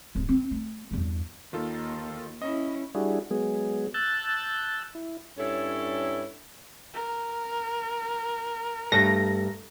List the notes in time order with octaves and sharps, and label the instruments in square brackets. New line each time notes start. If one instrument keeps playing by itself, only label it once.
[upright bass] D1 G#1
C4
A3
E2 G2
[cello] D#2 [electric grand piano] D#3 F4 A4
[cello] C#4 E4 [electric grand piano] D#5
[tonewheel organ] G3 D4 E4 F#4 G#4
F#3 G#3 B3 G#4
A5 E6 F#6 G6 A6
E4
[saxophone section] G2 C#4 E4 A4 C#5
[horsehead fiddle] A#4
[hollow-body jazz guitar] G2 A3 [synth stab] A#6